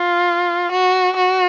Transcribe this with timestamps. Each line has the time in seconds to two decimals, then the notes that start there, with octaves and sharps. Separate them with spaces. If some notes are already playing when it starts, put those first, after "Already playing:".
Already playing: F4
0.72 F#4
1.16 F#4